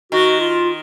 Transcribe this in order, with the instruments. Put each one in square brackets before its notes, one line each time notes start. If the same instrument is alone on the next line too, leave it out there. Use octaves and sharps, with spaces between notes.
[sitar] D#3 [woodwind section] F#4
[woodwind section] F4